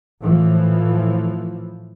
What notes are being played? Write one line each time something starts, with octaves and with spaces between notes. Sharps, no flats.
A2 E3 F3